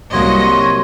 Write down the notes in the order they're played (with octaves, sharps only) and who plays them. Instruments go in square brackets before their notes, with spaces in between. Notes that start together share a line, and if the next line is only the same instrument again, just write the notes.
[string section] C2 D#5 [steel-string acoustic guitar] C3 F#3 A#3 [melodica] F#4 C#5 [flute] C6